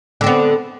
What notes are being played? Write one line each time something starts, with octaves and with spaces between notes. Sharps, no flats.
D3 B3 C4